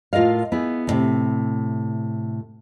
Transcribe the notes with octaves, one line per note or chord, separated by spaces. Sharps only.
A2 F4 A#4 D#5 F5
B3 E4 G#4
D#2 A2 C3